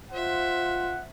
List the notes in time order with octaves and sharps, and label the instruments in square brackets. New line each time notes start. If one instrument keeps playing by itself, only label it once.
[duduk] F4 [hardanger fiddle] C5 E5 [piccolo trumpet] F#5